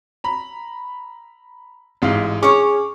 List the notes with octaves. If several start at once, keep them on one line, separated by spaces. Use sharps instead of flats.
A#5 B5
A1 G#2 F5
C#4 G#4 C#5 D6